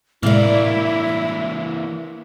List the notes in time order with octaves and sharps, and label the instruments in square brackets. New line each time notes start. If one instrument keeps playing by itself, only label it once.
[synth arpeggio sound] A2 C3 G#3 [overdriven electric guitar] E3 A#3 [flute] E4 [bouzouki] D5 F5